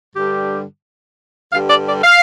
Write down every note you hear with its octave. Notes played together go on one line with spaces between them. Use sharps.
G2 D3 G3 G4
G2 D3 G3 F5
D5
D5
F5